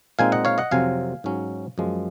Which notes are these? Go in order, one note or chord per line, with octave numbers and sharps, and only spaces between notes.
A#2 G#3 C4 D#4 F5 G#5
D#5 F#5
C#5 F5
D#5 F#5
F2 C3 F#3 C4 F5 G#5
G#2 F#3 C#4
F#2 F3 G#3